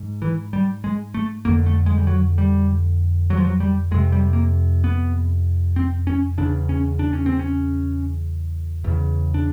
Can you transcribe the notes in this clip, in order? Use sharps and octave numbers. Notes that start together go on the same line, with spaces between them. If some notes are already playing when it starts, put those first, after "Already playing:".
Already playing: G#2
E3
G3
G#3
A3
F2 D3 A#3
A3
G#3
G3
F#3
G3
F#3
F3
F#3
G3
F2 C3 G#3
G3
A#3
B3
C4
C#4
E2 C#3 D4
C#4
D4
C#4
C4
C#4
E2 C#3
D4